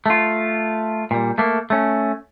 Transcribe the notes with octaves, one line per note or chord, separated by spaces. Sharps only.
A3 F4
A#2 G3
A3 A#3
A3 C#4